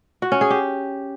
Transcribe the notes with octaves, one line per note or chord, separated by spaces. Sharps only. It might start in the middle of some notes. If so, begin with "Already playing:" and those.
F#4
C#4
G#4
G4